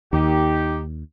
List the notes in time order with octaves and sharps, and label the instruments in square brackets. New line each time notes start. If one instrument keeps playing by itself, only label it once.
[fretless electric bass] D#2 [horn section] D#4 G4